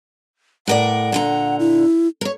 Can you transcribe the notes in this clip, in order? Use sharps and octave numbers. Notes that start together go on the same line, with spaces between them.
A2 A#4 D5 F#5
A#2 D3 A#5
E4
A#4 C#5